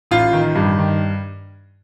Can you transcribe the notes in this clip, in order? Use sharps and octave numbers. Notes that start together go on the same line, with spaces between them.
A1 F4
D#3
G2
D#3